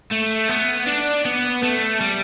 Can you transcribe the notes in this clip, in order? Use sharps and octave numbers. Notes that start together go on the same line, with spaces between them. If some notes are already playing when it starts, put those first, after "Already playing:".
A3
B3
D4
B3
A3
G3